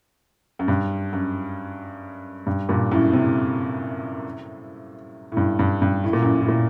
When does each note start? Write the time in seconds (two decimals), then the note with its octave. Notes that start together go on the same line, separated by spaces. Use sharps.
0.59 F#2
0.68 G2
1.13 F#2
2.47 G2
2.69 G2 A#2
2.92 F#2 A2
3.13 A2 C3
5.32 A2
5.37 G2
5.59 G2
5.82 G2
6.04 A2
6.13 A#2
6.22 F#2 A2
6.41 A2
6.48 A#2